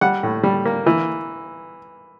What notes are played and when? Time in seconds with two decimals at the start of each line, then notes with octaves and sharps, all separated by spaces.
0.01 G3 F#5
0.23 A2
0.43 G3
0.65 A#3
0.86 E3